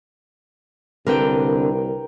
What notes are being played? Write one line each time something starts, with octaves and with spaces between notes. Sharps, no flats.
C2 D3 C4 A#4 B4 G5